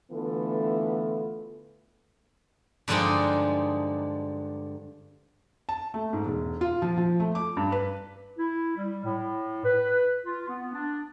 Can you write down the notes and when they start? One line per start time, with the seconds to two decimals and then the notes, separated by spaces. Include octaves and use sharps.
0.12 D3 E3 A3 B3 F4 A4
2.88 G2 D3 F3 G#3 D4 D#4
5.69 A5
5.94 A3
6.13 G#2
6.26 E1
6.61 F4
6.82 F3
6.98 F3
7.20 A3
7.35 D6
7.57 G2
7.72 B4
8.37 E4
8.76 G3
9.03 A2
9.64 B4
10.26 F4
10.48 B3
10.73 D4